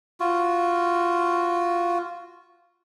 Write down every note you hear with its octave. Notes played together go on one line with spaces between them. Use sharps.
F4 F#4